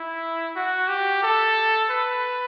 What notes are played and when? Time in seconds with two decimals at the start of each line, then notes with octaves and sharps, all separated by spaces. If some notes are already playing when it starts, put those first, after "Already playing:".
Already playing: E4
0.56 F#4
0.89 G4
1.23 A4
1.90 B4